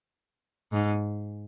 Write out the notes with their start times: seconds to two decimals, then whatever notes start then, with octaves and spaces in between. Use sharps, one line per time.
0.73 G#2